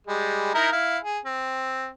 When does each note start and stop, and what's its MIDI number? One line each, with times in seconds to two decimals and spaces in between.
0.07 0.53 55
0.07 0.53 56
0.54 0.69 63
0.54 0.69 64
0.54 0.69 70
0.72 0.98 64
0.72 0.98 77
1.04 1.19 68
1.26 1.89 60